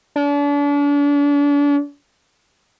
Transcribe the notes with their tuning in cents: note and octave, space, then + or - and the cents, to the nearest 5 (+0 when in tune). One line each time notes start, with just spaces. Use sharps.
D4 -40